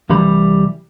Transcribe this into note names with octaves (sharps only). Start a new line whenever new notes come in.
C2 E3 G3 B5